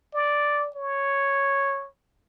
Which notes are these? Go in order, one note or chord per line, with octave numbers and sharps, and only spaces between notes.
D5
C#5